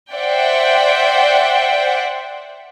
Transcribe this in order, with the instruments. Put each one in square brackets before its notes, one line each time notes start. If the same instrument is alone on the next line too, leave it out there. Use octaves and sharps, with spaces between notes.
[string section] C5 D5 E5 F#5 G5